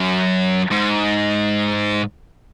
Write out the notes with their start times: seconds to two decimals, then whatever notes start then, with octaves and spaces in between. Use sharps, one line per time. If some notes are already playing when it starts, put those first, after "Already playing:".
Already playing: F#2
0.71 G#2